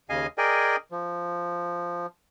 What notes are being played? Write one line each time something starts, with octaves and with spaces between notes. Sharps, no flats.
D#2 C#3 D#5 F5 G#5
G#4 A#4 D5 D#5 G5 G#5
F3